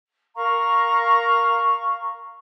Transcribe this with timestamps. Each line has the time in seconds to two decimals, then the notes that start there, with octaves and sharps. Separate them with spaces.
0.35 A#4 F5 A#5 C#6